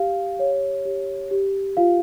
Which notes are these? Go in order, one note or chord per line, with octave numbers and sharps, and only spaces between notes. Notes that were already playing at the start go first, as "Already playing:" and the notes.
Already playing: G4 F5
C#5
G4
G4
F4 F5